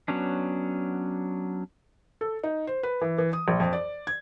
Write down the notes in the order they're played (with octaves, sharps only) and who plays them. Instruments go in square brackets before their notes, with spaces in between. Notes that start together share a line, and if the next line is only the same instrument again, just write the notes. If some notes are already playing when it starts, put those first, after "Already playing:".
[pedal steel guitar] F#3 B3 C#4 D4
[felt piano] A4
D#4
C5
B4
E3
E3
D#6
A#1
F2
D5
G#6